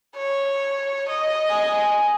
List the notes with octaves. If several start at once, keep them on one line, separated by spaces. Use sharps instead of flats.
C#5
D#5
G#5